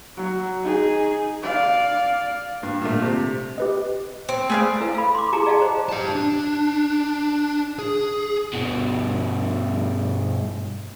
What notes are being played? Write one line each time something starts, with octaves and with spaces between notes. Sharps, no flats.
F#3
D#4 G#4
D5 F5
G2
A#2 D3 A3
C3
G4 B4 D#5
C4
A3 G#4 B4 D5 F5
E4 A4 B4 F5
F5 B5
C6 D6
E4 G4 G#4 A5 A#5 D6
G#4 D5 D#5 F5 F#5 A5
C5 A5
G4 A5
D4
G#4
G2 B2